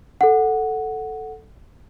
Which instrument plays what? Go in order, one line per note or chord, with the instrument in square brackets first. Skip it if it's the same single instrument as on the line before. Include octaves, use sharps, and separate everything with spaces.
[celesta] A4 F#5